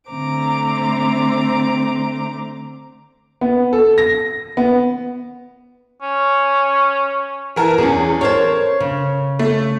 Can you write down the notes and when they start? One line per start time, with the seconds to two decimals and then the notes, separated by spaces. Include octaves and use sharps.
0.10 D3 A3 C4 C5 A#5 D6
3.41 B3
3.73 A4
3.98 A#6
4.57 B3
6.02 C#4
7.56 E3 A#4 A5
7.78 E2 C#4 G#4
8.21 A#4 C5 C#5 A5
8.80 C#3
9.39 A3